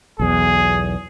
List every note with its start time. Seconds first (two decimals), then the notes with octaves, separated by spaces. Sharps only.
0.19 B1 E2 G#4